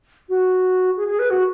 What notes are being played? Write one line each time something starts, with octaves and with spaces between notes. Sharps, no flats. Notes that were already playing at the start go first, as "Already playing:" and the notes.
F#4
G#4
G#4
B4
F#4